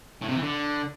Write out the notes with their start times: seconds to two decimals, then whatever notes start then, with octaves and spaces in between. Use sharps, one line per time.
0.21 A2
0.28 C3
0.35 E3
0.42 D3